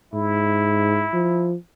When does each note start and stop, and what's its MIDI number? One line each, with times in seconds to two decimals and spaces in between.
0.14 1.07 44
0.14 1.51 64
1.14 1.56 53